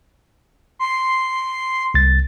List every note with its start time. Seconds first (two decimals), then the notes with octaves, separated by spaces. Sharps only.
0.79 C6
1.94 C2 A6